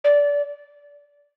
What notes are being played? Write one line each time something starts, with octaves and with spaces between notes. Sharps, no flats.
D5